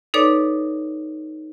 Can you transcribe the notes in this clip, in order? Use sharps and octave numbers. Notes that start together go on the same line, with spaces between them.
D#4 A4 B4 C#5 D5 D6